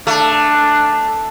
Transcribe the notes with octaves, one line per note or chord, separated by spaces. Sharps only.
A3 D4